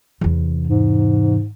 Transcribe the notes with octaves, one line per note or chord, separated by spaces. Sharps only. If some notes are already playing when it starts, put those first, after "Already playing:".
E2 C3
G#2